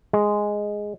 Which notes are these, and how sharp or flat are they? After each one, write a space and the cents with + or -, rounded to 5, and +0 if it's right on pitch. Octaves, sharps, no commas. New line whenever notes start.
G#3 +0